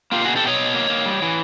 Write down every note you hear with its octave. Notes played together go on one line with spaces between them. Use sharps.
A#3 F4 G4
B2 F#4 G#4
G4 A4
B2 C#5 D#5
B2
A#3
A#3
G3
E3